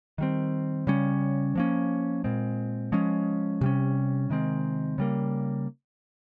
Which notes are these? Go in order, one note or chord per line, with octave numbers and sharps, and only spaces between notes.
D#3 G3 C4
C#3 G3 C#4
F3 A#3 C#4
A#2 G#3 C4
F3 G#3 C#4
C3 G3 C#4
C3 D#3 G#3 C4
C#3 G3 A#3